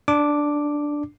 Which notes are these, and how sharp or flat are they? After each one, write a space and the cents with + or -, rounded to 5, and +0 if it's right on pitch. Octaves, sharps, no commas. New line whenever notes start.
D4 +0 D6 +0